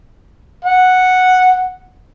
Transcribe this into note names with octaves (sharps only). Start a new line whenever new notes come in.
F#5